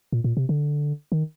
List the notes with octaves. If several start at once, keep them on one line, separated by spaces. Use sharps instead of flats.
A#2
A#2
C3
D3
D#3